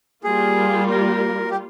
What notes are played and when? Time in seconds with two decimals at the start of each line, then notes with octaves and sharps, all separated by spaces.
0.24 G3 A#3 F4 G#4
0.90 A#4
1.51 G4